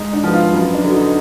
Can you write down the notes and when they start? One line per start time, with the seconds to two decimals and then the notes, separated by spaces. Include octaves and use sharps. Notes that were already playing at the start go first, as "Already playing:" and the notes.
Already playing: G#2 D#4
0.13 D4
0.23 F3 B3
0.33 F4
0.53 F#2 B3
0.74 D4
0.84 D3 F#3 B3
0.94 D#4